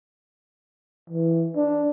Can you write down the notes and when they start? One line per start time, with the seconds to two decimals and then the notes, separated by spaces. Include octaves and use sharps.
1.10 E3
1.56 D4